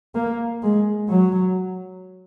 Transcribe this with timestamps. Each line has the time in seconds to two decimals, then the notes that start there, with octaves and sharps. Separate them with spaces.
0.15 A#3
0.62 G#3
1.09 F#3